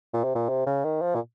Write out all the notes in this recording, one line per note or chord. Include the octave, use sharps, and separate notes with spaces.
A#2
C3
A#2
C3
C#3
D#3
F3
A#2